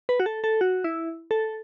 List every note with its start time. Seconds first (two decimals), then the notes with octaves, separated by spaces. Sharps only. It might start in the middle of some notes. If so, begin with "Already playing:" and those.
0.09 B4
0.20 F#4
0.26 A4
0.44 A4
0.61 F#4
0.84 E4
1.31 A4